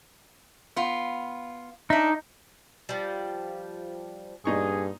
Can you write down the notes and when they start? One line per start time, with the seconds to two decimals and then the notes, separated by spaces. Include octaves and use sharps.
0.76 B3 F4
1.90 D4 D#4 E5
2.89 F3 G3
4.45 G2 A#2 D#4 G#4 C#6